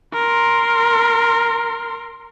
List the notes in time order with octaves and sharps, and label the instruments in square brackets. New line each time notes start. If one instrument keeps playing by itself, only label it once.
[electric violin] A#4 C6